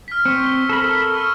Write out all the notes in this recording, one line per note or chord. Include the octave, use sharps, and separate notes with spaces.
F6 B6
C4 C#6 C#7
G7
A4 A#4 B5
C#6 E6 F6